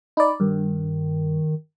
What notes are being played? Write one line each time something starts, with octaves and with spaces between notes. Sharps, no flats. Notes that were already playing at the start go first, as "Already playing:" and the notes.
D#4 D5 B5
G2 D#3